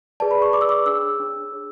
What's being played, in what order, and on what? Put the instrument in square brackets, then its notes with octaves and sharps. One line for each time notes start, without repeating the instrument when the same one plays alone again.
[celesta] G#4 B4 D5 A5
B5
C#6
G#4 B4 D5 D6
E6
D6
D4 G#4 C#5 E6
D4 G#4 C#5
G#4 C#5